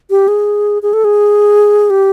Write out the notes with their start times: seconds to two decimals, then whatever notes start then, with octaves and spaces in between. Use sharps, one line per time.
0.10 G4
0.28 G#4
0.82 G#4
0.93 A4
1.04 G#4
1.90 G4